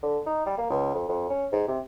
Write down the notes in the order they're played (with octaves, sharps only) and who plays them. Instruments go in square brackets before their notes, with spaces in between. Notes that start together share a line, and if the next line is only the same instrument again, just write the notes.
[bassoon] D3
D#4
G3
A#3
C#2
F2
F2
C#4
G#2
C3